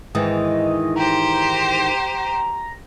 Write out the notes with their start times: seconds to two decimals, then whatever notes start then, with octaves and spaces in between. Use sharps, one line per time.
0.15 G#2 D#3 E3 D#5
0.96 G4 C5 A#5